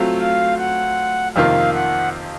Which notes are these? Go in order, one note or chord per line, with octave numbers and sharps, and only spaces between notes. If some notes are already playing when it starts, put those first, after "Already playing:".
Already playing: F#3 A3 C4 F4
F5
F#5
F2 C3 D#3 A#3 F4 F5
F#5